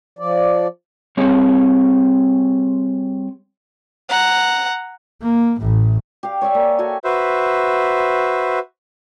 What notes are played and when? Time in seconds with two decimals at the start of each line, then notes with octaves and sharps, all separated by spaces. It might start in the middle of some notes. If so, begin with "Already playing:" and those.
0.19 F3 D5
1.17 G3 C4 G#4 C#5
4.09 F#5 A#5
5.22 A#3
5.60 A1 A2
6.23 G4 F5
6.41 C#5 D5 E5 G#5
6.55 A#3
6.79 F#4 A4 G5 G#5
7.03 F#4 B4 C5 E5